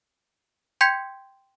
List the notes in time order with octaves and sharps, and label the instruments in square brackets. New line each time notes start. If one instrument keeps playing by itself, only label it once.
[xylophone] G5 C6 G6 G#6 B6 C#7